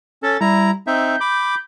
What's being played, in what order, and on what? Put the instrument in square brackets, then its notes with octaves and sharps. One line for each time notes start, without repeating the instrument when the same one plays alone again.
[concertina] C#4 A4 [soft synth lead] A6
[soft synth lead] G3 [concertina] E4 A#5
[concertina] C4 D#4 E5 [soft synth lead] G6
[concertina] B5 D6